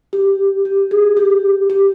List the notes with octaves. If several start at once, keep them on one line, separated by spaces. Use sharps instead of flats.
G4
G4
G#4
G4
G4